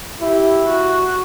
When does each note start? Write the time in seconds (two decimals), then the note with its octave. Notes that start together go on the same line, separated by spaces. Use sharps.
0.20 E4 G4
0.68 F#4